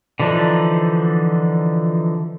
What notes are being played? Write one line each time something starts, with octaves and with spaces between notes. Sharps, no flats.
D3 E3 F3 D4 D#4